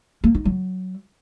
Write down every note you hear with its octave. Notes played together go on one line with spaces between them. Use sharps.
A#3
D#4
F#3